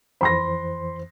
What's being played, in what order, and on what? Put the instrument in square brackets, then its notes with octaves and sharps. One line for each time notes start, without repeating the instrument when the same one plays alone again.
[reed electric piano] F2 E3 C5 [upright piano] B5 C6 A#6